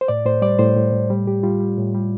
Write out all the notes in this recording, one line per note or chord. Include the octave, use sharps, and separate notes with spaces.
C5
A2 D5
A2 C5
G3 D5
A2 C5
A2
A2
G3
A2 G4
G3 F4
G3
A2
G3